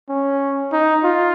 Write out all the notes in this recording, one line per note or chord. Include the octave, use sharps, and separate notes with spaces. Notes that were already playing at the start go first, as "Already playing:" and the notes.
C#4
D#4
F4